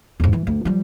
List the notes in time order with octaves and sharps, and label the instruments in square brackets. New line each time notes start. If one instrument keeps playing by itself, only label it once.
[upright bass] E2 G#2
E3
D2
F3 G3